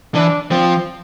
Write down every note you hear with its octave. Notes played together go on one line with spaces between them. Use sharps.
E3 D4
F3 C4